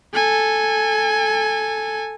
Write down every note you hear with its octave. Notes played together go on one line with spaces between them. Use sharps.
A4 G#5